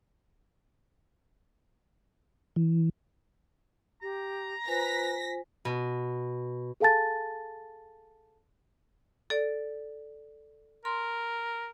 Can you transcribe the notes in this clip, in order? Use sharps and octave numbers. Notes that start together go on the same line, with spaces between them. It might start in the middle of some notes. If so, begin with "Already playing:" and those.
E3
G4 A#5
F4 B4 C5 G#5 A#6 B6
B2
G#4 A4 F5 G#5 A5 A6
A4 D5
A#4 C6